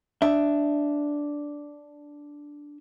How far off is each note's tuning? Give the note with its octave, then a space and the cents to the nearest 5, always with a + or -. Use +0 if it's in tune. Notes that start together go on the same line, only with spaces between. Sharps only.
D4 -5 E5 +0